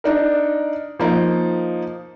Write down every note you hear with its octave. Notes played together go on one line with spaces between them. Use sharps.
D4 D#4 A#4
F3 A#3 D#4